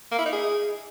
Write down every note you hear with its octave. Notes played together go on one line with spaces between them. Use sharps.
A#3
E4
D#4
G#4